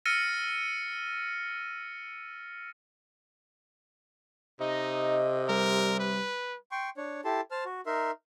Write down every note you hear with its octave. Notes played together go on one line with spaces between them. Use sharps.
E6 F6 A6 A#6 C#7 D#7
C3 D#4 D#5
G3 A#4
B4
G5 C6 C#6
D4 C#5
E4 G4 A4 A5 C6
C5 A5 F6
F#4
D#4 A#4 E5 C6